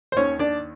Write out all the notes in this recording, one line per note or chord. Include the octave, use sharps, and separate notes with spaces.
C5
D#2 D#3 C#4 C#5
D4 D5